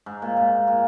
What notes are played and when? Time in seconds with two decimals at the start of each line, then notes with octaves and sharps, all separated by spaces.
0.06 G#2
0.22 A#2
0.37 G#2
0.68 A#2